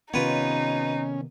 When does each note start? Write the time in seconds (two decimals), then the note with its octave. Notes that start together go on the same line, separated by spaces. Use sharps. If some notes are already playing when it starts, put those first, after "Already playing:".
0.14 C3 D#3 B3 C#4 D#4 F4 B4 C#5